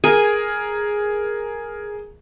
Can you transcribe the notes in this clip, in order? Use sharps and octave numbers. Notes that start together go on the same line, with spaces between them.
G#4 A#4 G#5